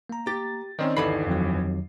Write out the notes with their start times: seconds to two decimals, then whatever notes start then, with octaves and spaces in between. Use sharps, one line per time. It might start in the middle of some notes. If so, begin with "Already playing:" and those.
0.09 A#3 A#5
0.27 G4 A6
0.79 D#3 C4 C#4 D#4 D5 D#5
0.97 G1 D#2 E3 A4 B5 C7
1.27 F2 F#3